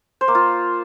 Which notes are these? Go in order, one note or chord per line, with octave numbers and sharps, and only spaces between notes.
C5
A#3
F4